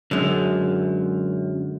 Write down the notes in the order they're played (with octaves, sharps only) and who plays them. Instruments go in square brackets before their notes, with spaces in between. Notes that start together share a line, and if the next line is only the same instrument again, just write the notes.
[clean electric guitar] F#2 [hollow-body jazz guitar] D3 G#3